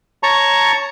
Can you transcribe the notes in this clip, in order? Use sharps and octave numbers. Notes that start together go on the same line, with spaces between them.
C#5 A5 A#5 C#6